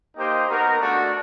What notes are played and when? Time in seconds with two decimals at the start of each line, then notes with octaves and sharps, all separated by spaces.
0.16 A#3 D#4 G4 C5 D#5
0.49 B3 D#4 F#4 A#4
0.80 A3 D4 F#4